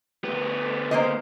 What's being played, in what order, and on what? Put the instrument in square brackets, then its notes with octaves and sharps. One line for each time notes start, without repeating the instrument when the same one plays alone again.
[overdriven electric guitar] D2 B3
[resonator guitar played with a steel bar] A#3 C5 D#5